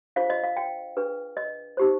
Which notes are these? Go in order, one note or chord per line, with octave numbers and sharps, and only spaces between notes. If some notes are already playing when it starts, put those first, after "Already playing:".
D4 F4 G#4 C5 F5
D#5
F5
G5
D4 G#4 B4
D#5
D#4 G4 C5